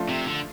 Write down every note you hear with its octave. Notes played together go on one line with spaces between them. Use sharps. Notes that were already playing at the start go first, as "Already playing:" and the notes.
Already playing: F3 A3 D4 F4
C3
D3